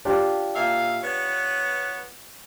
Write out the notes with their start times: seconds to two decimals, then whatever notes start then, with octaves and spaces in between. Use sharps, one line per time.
0.05 D4 F4 G4
0.54 A#2 E5 F5
1.02 B3 B4 C#5